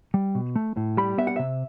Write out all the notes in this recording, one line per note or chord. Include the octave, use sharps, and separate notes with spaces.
G3
B2
A3
A2
G3 B5
B3 E5
F#5
C3 E5